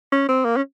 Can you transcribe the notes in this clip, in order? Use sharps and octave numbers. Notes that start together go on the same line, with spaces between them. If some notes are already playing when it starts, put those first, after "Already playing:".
C#4
C4
A#3
C#4